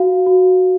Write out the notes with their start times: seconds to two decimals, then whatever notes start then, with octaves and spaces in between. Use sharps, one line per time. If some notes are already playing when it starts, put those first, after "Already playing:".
Already playing: F#4 F5
0.27 F#4